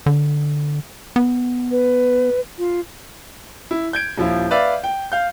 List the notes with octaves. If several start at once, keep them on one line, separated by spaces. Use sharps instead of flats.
D3
B3
B4
F4
E4
G6 G#6 D7
D#1 F3 E4 F4
B4 D5 E5 F5
G5
F5 G6